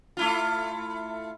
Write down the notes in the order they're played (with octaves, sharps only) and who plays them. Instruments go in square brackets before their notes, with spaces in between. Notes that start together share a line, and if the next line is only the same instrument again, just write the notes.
[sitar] A3 E4 F4